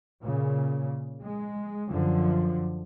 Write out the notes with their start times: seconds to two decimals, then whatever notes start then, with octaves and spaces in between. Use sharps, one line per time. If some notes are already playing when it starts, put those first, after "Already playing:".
0.22 A#2 C#3
1.22 G#3
1.88 F#2 D3 F3